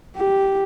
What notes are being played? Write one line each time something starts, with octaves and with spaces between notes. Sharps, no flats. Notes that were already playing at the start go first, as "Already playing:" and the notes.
G4